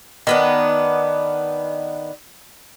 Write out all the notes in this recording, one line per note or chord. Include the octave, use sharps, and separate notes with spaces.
D#3 B3 D4